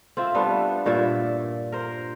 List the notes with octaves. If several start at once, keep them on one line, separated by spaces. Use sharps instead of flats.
C4 F4 E5
G3 A3 B3 D4
G2 A#2 D5 E5
A#4 C5